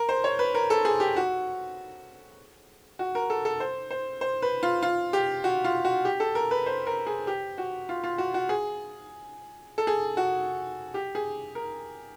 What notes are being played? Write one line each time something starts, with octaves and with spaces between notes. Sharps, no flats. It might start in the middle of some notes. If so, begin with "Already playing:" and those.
Already playing: A#4
C5
C#5
B4
A#4
A4
G#4
G4
F#4
F#4
A#4
A4
A4
C5
C5
C5
B4
F4
F4
G4
F#4
F4
F#4
G4
A4
A#4
B4
C5
A#4
G#4
G4
F#4
F4
F4
F#4
F#4
G#4
A4
G#4
F#4
G4
G#4
A#4